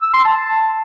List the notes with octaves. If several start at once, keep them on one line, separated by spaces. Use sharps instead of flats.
E6
C6
A5